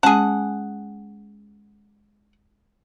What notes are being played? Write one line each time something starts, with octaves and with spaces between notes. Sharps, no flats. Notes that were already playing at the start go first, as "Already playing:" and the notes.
G#3 C#4 G#4 F#5 G#5 A5